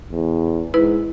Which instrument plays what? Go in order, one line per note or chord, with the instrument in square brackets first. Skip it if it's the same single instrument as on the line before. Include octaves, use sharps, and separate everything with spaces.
[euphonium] E2
[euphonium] G#2 [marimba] E4 B4